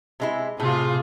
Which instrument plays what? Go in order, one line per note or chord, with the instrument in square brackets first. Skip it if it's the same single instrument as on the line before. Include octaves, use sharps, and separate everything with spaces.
[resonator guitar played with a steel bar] C3 G#3 E4
[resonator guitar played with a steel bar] A2 [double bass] C3 [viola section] F4 G#4